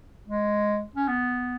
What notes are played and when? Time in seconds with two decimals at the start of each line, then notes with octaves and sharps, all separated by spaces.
0.28 G#3
0.95 C#4
1.08 B3